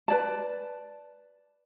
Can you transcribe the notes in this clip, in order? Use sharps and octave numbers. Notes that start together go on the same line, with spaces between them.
B4 D5 A5